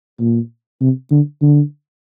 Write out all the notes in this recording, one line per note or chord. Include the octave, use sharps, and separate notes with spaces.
A#2
C3
D3
D3